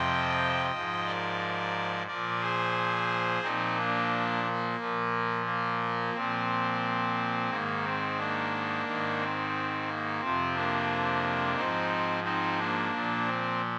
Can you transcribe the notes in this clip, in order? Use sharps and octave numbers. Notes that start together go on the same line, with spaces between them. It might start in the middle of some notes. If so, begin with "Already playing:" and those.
Already playing: F2 C3 F3 D#5 G5
G#2 F3
A#4 D5
A#2 F3 A#4 D5
G#4 C5
A#2 F3 C4 D#4
A#3 D4
A#3
A#2 F3
A#3
A#2 F3 C4
G#2 D#3 A#3
C4
A#3 D4
G#2 D#3
C4
A#3
F2 C3 F3 C4
A#3 D4
G#2 F3 C4 D#4
C4 D#4
A#3 D4
A#2 F3
C4